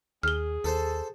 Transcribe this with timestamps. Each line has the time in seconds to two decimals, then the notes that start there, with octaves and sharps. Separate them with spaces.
0.23 D#2 G#4 F6 G7
0.64 D#2 A4 C5